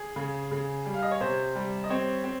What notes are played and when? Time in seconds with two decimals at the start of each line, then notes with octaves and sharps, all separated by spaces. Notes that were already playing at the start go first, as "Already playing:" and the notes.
Already playing: G#4
0.16 C#3
0.51 C#3
0.86 G3
0.94 F5
1.02 D#5
1.11 C#5
1.20 C3 C5
1.55 G3
1.84 D#5
1.90 C4 C#5
2.24 C4